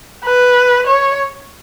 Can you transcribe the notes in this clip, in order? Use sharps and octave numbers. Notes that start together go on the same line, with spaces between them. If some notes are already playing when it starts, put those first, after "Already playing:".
B4
C#5